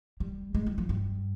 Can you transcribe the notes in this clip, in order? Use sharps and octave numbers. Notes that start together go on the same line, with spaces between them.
G3
G#3
G3
F3
G2